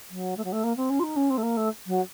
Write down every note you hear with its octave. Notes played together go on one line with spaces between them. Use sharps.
F#3
A3
F#3
A3
A#3
C4
C#4
F4
D#4
C#4
C4
A3
A#3
A3
F#3